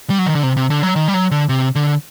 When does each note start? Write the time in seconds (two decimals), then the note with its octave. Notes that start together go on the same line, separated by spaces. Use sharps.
0.10 G3
0.19 F#3
0.26 D#3
0.35 D3
0.43 C3
0.57 C3
0.70 D3
0.83 F#3
0.96 D#3
1.08 G3
1.14 F#3
1.31 D3
1.49 C3
1.75 D3